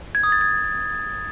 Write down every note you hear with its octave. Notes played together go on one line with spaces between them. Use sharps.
G#6
D#6
A6
G#6